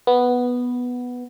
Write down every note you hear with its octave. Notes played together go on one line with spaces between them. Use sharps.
B3